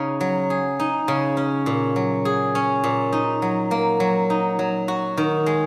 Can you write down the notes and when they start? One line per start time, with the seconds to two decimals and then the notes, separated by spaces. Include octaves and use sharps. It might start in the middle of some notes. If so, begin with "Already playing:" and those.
Already playing: C#3 D#4
0.21 F#3
0.50 G#4
0.80 D#4
1.08 C#3
1.37 C#4
1.66 A#2
1.96 F#3
2.25 G#4
2.55 C#4
2.84 A#2
3.13 D#4
3.42 F#3
3.71 A#3
4.00 F#3
4.30 D#4
4.59 F#3
4.88 F#4
5.18 D#3
5.46 G#3